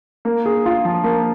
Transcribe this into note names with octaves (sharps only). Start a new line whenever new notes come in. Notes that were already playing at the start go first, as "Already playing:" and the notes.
A#3
G#4
F4
F3
A#3